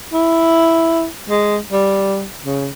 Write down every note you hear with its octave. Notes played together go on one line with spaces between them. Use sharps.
E4
G#3
G3
C#3